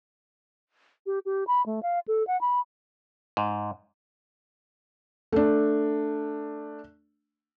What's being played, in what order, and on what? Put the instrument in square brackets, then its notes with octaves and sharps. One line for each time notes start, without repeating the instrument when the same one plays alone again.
[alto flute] G4
G4
B5
A3
F5
A4
F#5
B5
[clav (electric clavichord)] G#2
[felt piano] A3 D4